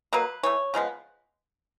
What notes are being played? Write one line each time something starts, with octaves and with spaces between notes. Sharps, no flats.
B2 F#3 A#3 B4
E3 A3 C#5
C#3 F3 G#3 B3